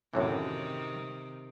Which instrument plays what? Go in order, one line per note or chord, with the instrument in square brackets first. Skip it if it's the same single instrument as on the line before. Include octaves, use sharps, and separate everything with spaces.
[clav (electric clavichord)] F#2 A2 E3 [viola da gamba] C3 D#3